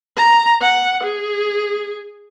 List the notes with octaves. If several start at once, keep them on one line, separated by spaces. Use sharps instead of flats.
A#5
F#5
G#4